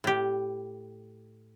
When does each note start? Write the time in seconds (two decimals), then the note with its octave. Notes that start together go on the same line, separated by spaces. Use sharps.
0.04 A2 G4